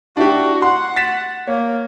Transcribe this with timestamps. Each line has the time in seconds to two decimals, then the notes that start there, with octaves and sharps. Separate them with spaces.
0.17 D4 E4 F#4 G4
0.62 F#5 C6
0.96 A6 B6 E7
1.47 A#3 C#5